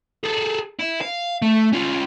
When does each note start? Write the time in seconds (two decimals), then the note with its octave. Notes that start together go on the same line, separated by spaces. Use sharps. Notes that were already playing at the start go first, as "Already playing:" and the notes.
0.24 G#4 A4
0.79 E4
1.01 F5
1.42 A3
1.73 C#4 F4